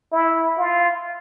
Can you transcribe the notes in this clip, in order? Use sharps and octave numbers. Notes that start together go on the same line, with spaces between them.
E4
F4